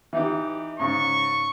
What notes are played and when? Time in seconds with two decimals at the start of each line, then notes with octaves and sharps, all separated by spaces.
0.13 E3 D#4 G4
0.79 G#2 C#3 C#6